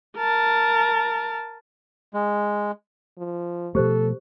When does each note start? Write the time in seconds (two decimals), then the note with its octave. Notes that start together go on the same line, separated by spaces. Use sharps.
0.17 A#4 A5
2.14 G#3
3.18 F3
3.75 B2 F3 A3 G4 A4 C5